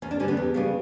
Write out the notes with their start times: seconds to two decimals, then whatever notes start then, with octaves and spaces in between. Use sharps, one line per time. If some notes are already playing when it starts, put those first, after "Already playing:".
0.02 E2 C#4
0.11 D4
0.20 D3 G3 C#4
0.28 B3
0.37 E2
0.54 C#3 G3 B3